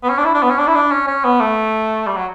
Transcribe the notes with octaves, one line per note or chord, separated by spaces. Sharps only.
B3
C#4
D4
E4
D4
B3
C#4
D4
E4
D4
C#4
C#4
B3
A3
G3
F#3